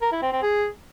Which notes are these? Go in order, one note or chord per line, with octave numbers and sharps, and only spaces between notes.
A#4
E4
C4
C4
G#4